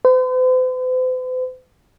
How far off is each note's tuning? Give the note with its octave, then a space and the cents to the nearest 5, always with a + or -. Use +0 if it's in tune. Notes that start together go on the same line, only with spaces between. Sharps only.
C5 -45